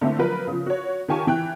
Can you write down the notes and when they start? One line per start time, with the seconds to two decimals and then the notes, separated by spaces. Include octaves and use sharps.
0.01 D3 A3 A#3 C4 E4
0.19 F3 F#3 A#4 B4
0.47 C#3 F3
0.66 F#4 C#5
1.08 D#3 F4 G4 G#5 A5 C#6
1.27 E3 G5 F#6